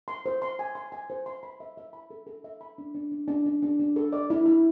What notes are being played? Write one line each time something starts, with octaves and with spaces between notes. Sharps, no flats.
C6
C5
C6
G#5
C6
G#5
C5
C6
B5
E5
E5
B5
A4
A4
E5
B5
D4
D4
D4
D4
D4
D4
D4
A4
D5
E4
E4